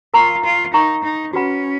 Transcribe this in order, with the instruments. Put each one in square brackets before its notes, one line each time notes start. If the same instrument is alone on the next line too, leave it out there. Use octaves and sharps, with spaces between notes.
[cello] F4 [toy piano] A#4 F5 A#5 C#6
[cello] F4
[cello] D#4 [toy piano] A#4 F5 A#5 C#6
[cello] D#4
[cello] C#4 [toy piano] F#4 B4 F#5 B5